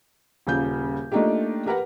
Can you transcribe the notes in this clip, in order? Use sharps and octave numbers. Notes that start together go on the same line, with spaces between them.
D#1 C#3 F4 F5 G6
A3 A#3 D4 D#4 F4 G4
G4 A#4 B4 F#5